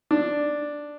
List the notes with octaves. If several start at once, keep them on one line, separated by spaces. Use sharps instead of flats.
D4